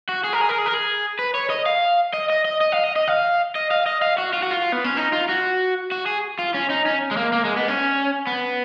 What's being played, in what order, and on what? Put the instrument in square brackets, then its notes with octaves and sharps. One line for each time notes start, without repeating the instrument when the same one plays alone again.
[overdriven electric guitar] F#4
G#4
A#4
G#4
A#4
G#4
A#4
G#4
B4
C#5
D#5
F5
D#5
D#5
D#5
D#5
F5
D#5
D#5
F5
D#5
F5
D#5
F5
F#4
F4
F#4
F4
B3
C#4
D#4
F4
F#4
F#4
G#4
F4
C#4
D#4
C#4
G#3
A#3
A#3
G#3
B3
C#4
B3